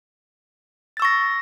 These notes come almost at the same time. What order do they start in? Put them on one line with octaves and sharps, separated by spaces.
A6 E6 C#6 A#6